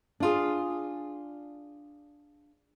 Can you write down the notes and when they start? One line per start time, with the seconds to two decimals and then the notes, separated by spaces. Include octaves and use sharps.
0.20 D4 F4 G#4